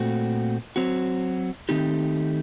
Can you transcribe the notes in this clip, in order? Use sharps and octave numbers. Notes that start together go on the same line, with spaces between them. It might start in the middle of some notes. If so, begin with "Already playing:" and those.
Already playing: A#2 A3 C4 F#4
F#3 C4 F#4
D#3 A3 C4 D#4 G4